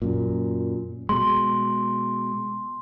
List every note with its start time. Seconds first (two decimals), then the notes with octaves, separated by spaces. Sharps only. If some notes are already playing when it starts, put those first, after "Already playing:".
0.02 F#2 A#2
1.09 B2 G#3 C6